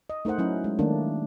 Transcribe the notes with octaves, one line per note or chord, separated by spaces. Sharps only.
D#5
A3 D#4 A#4 C5 F#5
F#3 C#4 E4
G#3
D#3 A3 A#3 D4